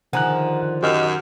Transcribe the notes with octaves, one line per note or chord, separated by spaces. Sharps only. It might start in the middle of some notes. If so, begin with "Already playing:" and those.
D3 D#3 F3 G#4 F#5 A#5 F#6
F#2 D#3 G4 D#5